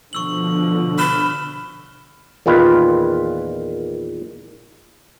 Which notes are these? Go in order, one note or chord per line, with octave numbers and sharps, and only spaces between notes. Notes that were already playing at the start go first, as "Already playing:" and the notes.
B2 D3 F3 C#6 E6 F#7
B5 F6 E7 G7
E2 A#2 D#3 F4 B4